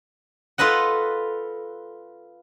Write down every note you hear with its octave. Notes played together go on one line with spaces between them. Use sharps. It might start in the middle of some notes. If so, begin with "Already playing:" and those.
F4 A4 B4 D#5 F#5